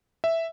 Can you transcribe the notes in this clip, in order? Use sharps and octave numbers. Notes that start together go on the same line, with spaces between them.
E5